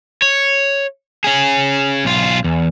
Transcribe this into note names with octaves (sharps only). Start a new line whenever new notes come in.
C#5
C#4 G#4
B1 F4
E2